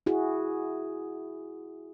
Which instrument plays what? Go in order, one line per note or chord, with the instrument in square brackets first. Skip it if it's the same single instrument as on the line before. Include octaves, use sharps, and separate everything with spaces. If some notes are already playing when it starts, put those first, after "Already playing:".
[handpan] E4 F#4 G#4